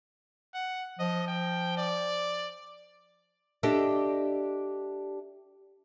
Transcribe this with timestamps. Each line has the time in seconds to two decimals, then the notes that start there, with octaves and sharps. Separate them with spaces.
0.54 F#5
0.99 F3 D#5
1.28 G5
1.77 D5
3.63 D4 G4 A4 D#5 E5